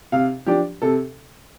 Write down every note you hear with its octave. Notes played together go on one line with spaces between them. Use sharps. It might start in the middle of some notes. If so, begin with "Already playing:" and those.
C3 F5
F3 D4 G4
C3 A4